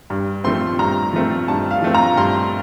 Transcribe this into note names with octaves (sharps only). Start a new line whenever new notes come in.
G2
F3 A3 C4 C6
G2 A#5
F3 A3 C4
G2 A5
F5
F3 A3 C4
A#5
G2 C6